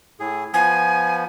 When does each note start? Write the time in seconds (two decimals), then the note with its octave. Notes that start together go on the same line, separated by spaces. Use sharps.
0.20 A2 G#4
0.54 F3 B3 G#5